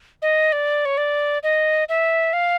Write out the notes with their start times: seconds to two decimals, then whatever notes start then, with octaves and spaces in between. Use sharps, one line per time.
0.22 D#5
0.52 D5
0.85 C#5
0.97 D5
1.43 D#5
1.89 E5
2.33 F5